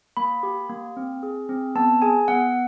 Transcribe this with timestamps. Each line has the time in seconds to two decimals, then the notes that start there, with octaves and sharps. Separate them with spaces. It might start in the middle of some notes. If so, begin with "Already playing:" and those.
0.17 A#3 B5
0.43 G4
0.70 A#3
0.97 C4
1.23 G#4
1.49 C4
1.76 B3 A5
2.02 G#4 G#5
2.28 B3 F#5